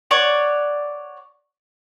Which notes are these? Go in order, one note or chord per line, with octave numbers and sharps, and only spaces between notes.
C#5 D5 F#5